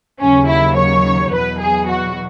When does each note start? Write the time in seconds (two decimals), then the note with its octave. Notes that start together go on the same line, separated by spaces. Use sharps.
0.21 D#2 C#3 F#3 C#4
0.49 E4
0.77 C#5
1.33 E2 B2 F#3 B4
1.61 G#4
1.90 F#4